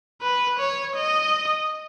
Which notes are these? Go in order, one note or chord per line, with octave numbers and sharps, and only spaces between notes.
B4
C#5
D#5